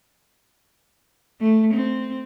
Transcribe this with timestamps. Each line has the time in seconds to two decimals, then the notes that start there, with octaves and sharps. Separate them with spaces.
1.41 A3
1.74 C4